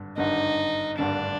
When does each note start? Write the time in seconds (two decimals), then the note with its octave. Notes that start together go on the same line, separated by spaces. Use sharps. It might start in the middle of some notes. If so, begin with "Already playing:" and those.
Already playing: G#1 G2 D3
0.17 G#1 G2 D3 D#4
0.98 G#1 G2 D3 D4